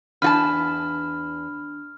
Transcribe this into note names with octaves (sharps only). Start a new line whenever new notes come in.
E2 D4 F4 A5 B5 F6